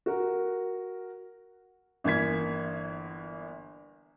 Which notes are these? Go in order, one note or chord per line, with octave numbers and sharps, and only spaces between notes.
F#4 A#4
G1 E3 A#3 G#6 B6